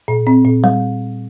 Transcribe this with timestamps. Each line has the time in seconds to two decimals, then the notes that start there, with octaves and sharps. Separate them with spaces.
0.08 A#2
0.27 C4
0.45 A#2
0.64 G3